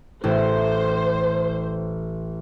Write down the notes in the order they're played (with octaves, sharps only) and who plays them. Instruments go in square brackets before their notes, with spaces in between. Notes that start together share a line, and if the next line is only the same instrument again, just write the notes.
[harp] A1 A2 [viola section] C5